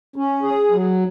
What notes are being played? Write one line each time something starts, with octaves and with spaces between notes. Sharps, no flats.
C#4
G#4
F#3